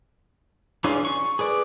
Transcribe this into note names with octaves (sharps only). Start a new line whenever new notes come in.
E3 C#4 D4 F4 G#4
C#6
G#4 B4 D5